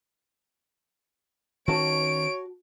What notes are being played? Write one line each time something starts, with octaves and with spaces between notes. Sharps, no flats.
D#3 C#4 F#4 C#5 A5 D7